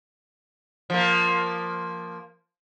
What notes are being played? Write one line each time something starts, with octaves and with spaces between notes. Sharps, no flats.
F3 A#3